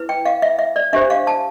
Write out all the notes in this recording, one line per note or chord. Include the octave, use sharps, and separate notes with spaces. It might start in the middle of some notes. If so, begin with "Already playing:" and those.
Already playing: E4 B4
G5
F5
E5
E5
D5
D4 G4 C5 E5
F5
A5